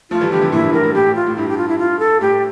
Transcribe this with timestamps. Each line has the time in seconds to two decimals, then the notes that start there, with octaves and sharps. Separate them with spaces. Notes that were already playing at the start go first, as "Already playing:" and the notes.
0.11 F3 A3 F4
0.21 E3 G3
0.31 D3 F3 G4
0.42 C3 E3
0.52 A#2 D3 E4
0.62 G2 A#2
0.73 A2 A#4
0.83 A2
0.94 A2 G4
1.06 A2
1.15 F4
1.26 A2
1.37 G2 E4
1.49 G4
1.58 F4
1.68 E4
1.79 F4
1.99 A4
2.21 A2 G4